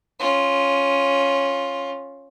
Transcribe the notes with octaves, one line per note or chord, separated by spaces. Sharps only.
C#4 F4